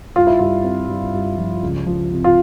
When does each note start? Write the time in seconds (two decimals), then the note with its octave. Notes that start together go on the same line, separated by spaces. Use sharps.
0.16 G2 F4
0.27 E4
0.39 G2 F4
0.64 C4
0.89 G2
1.14 G2
1.38 F3
1.62 C#2
1.87 F3
2.11 C3
2.24 F4